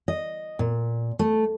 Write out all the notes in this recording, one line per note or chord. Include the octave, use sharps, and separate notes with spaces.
D#5
A#2
A3